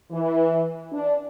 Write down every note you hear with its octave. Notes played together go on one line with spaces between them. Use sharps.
E3
D4